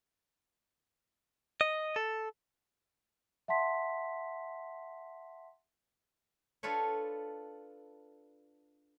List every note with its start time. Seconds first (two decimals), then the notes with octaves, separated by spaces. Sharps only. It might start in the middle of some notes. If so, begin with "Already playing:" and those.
1.61 D#5
1.96 A4
3.48 E5 F#5 A5 C6 B6
6.63 D4 F4 A4 B4 C#5